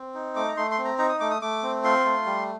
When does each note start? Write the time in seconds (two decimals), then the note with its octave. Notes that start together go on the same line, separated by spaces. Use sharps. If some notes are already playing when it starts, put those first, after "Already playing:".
Already playing: C4
0.14 D#4
0.36 A3 D6
0.48 A#5
0.57 A3 C6
0.71 C6
0.78 C4
0.85 A#5
0.98 D#4 A#5
1.09 D#6
1.20 A3 D6
1.31 D#6
1.42 A3 D6
1.63 C4
1.84 F4 C6
2.04 A3
2.26 G3